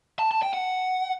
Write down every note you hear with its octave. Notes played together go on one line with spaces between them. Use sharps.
A5
A5
G5
F#5